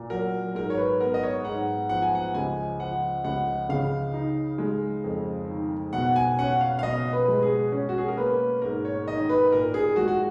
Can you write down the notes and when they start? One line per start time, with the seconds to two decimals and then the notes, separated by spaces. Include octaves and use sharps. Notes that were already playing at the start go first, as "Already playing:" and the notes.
Already playing: A#2
0.10 F#3 A#4
0.55 G#2 A#4
0.70 C#5
0.78 B4
1.00 B3 A#4
1.14 D#5
1.23 C#5
1.44 G#2 F#5
1.89 F3 F#5
2.02 G#5
2.15 F#5
2.34 C#2 G#5
2.80 F3 F#5
3.24 C#2 F#5
3.69 C#3 F5
4.14 D#4
4.58 G#3
5.04 F2
5.48 D#3
5.93 B2 F#5
6.16 G#5
6.39 C#4 F#5
6.61 F5
6.79 F5
6.83 B2 D#5
7.13 B4
7.28 G#3
7.43 G#4
7.72 C#4
7.89 F#4
7.98 G#4
8.08 A#4
8.17 A#3 B4
8.62 G#2 A#4
8.85 C#5
9.07 D#3 D#5
9.29 B4
9.52 A#2 A#4
9.74 G#4
9.96 G#3 F#4
10.08 F#4